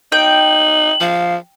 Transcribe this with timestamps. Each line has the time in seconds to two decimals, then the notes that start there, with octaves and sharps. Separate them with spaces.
0.12 D#4 G5 F#7
1.01 F3 F5